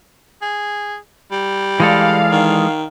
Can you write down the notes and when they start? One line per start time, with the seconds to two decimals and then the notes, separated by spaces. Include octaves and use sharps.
0.42 G#4
1.32 G3
1.80 E3 G#3 A4 D5 F5
2.31 D#3